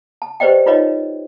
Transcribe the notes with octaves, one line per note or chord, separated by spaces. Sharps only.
A5
G4 B4 C5 D5 D#5 G5
D#4 F4 B4 C#5 D#5